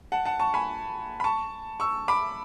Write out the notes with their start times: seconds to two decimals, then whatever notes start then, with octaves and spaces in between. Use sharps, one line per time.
0.12 F#5 A5
0.25 F#5 A5
0.40 A5 C#6
0.54 G#5 B5
1.20 B5
1.24 A5 C#6
1.80 C#6 E6
2.08 B5 D6